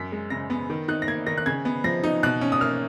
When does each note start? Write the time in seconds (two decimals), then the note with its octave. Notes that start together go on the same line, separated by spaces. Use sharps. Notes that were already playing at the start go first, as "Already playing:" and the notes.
Already playing: F#2 B6
0.12 G#3
0.30 C#3 A#6
0.50 B3
0.70 D#3
0.88 D#4 F#6
1.02 A#6
1.07 A#3 G#6
1.27 D#3 A#6
1.38 F#6
1.46 C#3 G#6
1.65 B3
1.84 F3 A#6
2.03 D#4
2.23 B2 F#6
2.41 C#4
2.52 D#6
2.61 A#3 F6